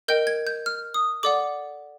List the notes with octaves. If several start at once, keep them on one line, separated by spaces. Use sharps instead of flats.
A#4 D#5 G5 G6
G#6
G6
F6
D#6
A4 D5 F#5 D6